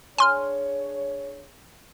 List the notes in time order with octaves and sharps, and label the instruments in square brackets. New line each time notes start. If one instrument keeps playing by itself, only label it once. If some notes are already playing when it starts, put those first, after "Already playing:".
[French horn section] D4 G#4 C#5 [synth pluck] G#5 C6 F6